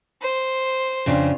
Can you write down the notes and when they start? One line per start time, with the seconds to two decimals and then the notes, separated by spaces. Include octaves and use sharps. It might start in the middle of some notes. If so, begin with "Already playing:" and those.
0.21 C5
1.06 F2 C#3 D4